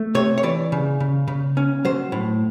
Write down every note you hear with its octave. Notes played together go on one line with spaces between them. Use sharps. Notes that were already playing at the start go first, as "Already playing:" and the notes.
Already playing: A3
C3 C#5
C#5
E3 D5
C#3
C#3
C#3
C#4
F#3 C5
A2